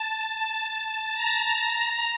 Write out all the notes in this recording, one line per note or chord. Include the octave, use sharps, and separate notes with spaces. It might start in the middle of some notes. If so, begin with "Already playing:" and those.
Already playing: A5
A5
A#5
A#5